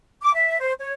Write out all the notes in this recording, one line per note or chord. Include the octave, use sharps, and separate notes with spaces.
D6
E5
C5
C#5